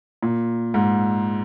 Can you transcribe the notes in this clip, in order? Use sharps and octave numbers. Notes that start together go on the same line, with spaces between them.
A#2
G#2